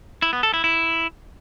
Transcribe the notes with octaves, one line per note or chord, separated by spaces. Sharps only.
E4
B3
A4
E4
E4